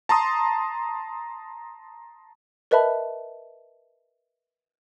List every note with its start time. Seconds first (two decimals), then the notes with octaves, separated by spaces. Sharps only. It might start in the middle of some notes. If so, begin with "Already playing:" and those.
0.09 A5 A#5 C6 D#6
2.71 A#4 B4 D#5 E5 A5 B5